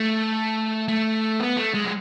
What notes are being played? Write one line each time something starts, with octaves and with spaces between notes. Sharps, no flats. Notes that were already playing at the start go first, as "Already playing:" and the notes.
Already playing: A3
A3
B3
A3
G#3
F#3